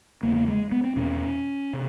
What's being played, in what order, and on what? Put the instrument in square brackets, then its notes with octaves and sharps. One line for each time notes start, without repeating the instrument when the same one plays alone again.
[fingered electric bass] E2 C#3 A#3
A#3
G#3
B3
C4
E2 B2 C#4
C3